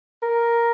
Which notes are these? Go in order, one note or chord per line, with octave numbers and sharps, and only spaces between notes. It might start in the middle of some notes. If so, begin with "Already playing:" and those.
A#4